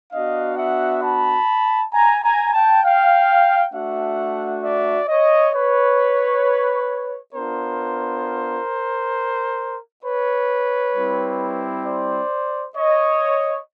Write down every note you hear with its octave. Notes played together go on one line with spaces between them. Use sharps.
B3 D4 F#4 D#5 F5
E5 F#5
A5 B5
G#5 A#5
G#5 A#5
G5 A5
F5 G5
A3 D4 F#4 E5 F#5
D5 E5
C#5 D#5
B4 C#5
B3 D4 F4 A#4 C5
B4 C#5
G3 C4 E4
C5 D5
C#5 D#5